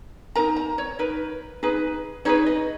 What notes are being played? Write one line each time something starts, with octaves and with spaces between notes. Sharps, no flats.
D#4 A#4 A#5
A#5
C#5
D#4 A#4 B4
D#4 G#4 B4
D#4 G#4 B4 C#5
D#5